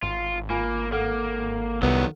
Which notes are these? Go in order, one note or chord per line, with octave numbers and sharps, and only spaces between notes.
G#1 F4
A#3 F4 G#5 B5
A#3 A4 F#5 F6
C2 D#3 F#3 B3